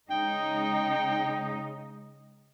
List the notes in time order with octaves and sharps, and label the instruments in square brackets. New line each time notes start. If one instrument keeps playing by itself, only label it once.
[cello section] C#3 G#3 D#4 [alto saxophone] G5